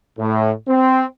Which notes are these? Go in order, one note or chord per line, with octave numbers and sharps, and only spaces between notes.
A2
C4